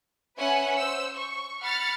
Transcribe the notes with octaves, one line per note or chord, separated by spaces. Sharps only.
C#4 B4 E5 F#5 G#5
C5 E6
C#6
F#5 B5 F6 A6 C#7